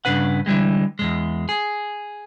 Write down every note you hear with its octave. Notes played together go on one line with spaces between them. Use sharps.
G2 C#3 D4 B4 F#5
D3 E3 G3 G#3
E2 G#2 G#3
G#4